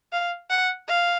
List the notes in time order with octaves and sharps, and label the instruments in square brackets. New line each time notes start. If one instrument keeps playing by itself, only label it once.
[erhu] F5
F#5
F5